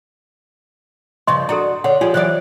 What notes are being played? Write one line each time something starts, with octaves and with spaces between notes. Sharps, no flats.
G2 C#3 F3 D#5 C6 C#6
D4 F#4 A4 A#5
D3 C#5 F#5
F3 F4 G4 G#4
E3 F#3 C5 D5